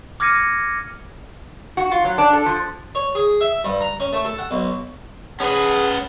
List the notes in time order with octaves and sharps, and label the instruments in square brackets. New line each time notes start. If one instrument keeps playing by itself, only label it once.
[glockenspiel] D6 F6 G#6 A#6 C#7 D#7
[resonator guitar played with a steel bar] F#4
F4
F#3
D4
A4
F3
[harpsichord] C#5
G#4
E5
G2
A#5
C#4
A3
A4
F#5
B1
[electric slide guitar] C#4 B4 [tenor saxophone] G#4 [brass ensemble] F#5